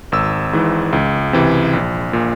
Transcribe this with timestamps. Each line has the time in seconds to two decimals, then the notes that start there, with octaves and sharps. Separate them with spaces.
0.12 G#1 E6
0.53 G#2 E3
0.93 C#2
1.33 C3 E3
1.73 A#1
2.13 A#2